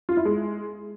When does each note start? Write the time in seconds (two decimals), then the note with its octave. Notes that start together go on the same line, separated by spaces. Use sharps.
0.09 F4
0.17 E4
0.25 G#3